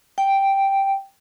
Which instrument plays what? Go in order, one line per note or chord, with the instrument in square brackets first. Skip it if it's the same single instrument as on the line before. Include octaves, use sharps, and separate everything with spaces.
[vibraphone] G5